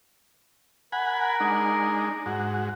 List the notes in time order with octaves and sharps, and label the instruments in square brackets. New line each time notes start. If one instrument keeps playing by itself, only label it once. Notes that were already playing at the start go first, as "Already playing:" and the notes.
[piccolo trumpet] A#4 [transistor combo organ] F#5 G#5 B5
[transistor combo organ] G#3 D4 D#4
G#2 F#4